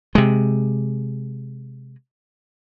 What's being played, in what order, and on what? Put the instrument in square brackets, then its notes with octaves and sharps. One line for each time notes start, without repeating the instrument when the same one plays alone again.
[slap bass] C3 G#3